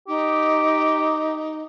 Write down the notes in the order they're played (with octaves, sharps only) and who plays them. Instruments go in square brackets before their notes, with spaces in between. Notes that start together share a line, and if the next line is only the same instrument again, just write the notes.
[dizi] D#4 [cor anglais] G4